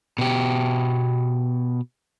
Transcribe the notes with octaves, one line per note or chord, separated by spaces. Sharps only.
B2 G4